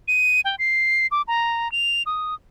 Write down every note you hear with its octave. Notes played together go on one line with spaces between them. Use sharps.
D#7
G5
C7
D6
A#5
F7
D#6